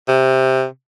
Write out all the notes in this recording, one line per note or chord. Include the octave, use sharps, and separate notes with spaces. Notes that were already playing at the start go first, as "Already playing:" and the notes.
C3